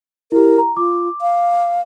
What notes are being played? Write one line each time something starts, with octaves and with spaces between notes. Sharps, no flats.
E4 G4 A#4
A#5
F4 D6
F5